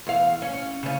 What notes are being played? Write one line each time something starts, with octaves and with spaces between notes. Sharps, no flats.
E2 F5
C#4
C#3 C#4